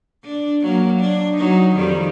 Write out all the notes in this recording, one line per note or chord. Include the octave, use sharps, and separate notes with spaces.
D4
F#3 A#3
D4
F#3 D#4
F2 D#3 G3